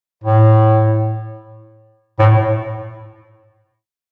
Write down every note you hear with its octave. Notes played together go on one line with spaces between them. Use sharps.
A2
A2